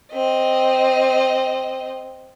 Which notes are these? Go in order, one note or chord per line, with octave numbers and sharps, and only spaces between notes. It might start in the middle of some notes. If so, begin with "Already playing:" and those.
C4 D#5